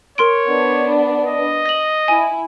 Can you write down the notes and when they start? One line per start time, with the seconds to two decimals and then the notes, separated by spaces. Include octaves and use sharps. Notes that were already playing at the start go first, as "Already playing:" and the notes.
0.18 A#4 C#5 C6 D7
0.47 B3 D4
1.27 D#5
1.66 A#6 F#7
2.08 E4 G#5